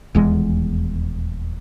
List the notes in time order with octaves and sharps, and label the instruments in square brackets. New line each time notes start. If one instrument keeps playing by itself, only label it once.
[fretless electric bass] D#1 E2 G#3